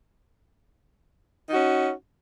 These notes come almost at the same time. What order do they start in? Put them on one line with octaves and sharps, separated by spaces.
D#4 F#4 C#4